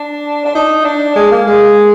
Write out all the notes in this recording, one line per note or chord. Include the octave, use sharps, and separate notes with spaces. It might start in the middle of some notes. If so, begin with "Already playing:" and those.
Already playing: D4
D4
D#4
D4
G#3
A#3
G#3